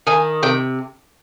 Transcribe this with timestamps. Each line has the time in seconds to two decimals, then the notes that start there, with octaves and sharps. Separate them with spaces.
0.07 D#3 G#5
0.43 C3 G5